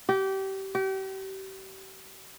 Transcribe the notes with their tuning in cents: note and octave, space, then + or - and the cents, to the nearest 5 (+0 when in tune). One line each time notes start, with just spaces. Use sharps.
G4 -25
G4 -35